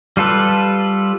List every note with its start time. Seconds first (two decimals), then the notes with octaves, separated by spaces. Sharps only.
0.17 G3 F4 A4 B4